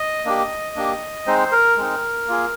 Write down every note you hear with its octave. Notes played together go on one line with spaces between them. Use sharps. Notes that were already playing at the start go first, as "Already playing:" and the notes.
Already playing: D#5
A#3 D4 G4
A#3 D4 G4
G#3 C4 D#4 C5
A#4
G#3 C4 D#4
A#3 F4 G#4